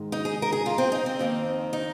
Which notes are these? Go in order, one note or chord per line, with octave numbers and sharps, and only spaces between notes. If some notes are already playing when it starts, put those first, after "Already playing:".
Already playing: G#2 D#3 G#3
D#4
G#4
A#4
G#4
F4
C4
D#4
C4
F2 D#3 A#3
D#4